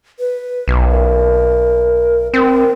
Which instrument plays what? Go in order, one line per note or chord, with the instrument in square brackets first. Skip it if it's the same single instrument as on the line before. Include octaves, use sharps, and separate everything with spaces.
[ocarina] B4
[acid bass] B1
[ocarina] A#4
[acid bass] C4 [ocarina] A#4